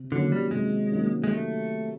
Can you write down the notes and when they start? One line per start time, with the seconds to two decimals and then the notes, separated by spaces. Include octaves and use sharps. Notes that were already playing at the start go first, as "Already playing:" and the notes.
Already playing: C3
0.11 D3 D#3 F#3 A#3 C#4
0.32 G3
0.51 C3 G#3
0.92 D#3 F#3 A#3 C#4
1.24 G#3
1.33 A3